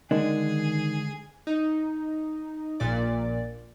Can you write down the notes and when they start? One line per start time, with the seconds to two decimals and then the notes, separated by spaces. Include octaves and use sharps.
0.11 D3 D#3 G#3 D4 G#4
1.47 D#4
2.80 A#1 A#2 D5